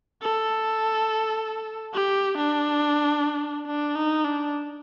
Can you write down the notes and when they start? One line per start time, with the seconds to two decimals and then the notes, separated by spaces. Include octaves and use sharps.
0.23 A4
1.94 G4
2.38 D4
3.67 D4
3.96 D#4
4.25 D4